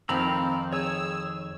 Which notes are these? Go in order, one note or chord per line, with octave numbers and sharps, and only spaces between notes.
F2 D#3 F3 C4 F5 A#5 B5 E6
G#4 C#5 E6